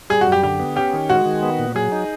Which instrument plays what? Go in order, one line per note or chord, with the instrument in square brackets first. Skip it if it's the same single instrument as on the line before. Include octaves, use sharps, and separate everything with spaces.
[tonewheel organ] G3 [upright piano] G#4
[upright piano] F#4
[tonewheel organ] F#2
[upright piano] G4
[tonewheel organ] D3 [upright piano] G4
[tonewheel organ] B3
[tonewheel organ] C#4 [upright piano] G4
[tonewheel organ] D#3
[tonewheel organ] G#3 [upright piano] F#4
[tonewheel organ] D#3
B3
A#2
[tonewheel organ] F#3 [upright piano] G#4
[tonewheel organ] D#4